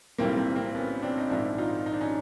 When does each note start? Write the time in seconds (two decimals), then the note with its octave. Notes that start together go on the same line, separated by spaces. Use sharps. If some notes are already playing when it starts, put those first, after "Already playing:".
0.18 B1 A2 E3 G3 A#3 C4
0.37 A#3 C4
0.55 A#3 C4
0.75 B3 C#4
1.02 C4 D4
1.18 D#4
1.30 A#1 G#2 D#3 D4 E4
1.58 D#4 F4
1.86 D#4
1.94 D4
2.01 C#4 D#4